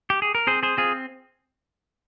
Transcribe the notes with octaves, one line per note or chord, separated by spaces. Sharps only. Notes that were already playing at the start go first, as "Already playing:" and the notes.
G4
G#4
A#4
C4 G#4 C5
G#4 C5
C4 F4 G#4